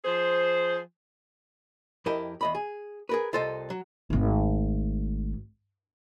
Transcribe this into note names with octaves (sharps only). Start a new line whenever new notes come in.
F3 G#4 C5
F2 E4 G4 A#4 D#5
E2 D#5 B5
G#4
G#4 A#4 B4
C2 F4 A4 C5 D#5
F#3
G#1 A3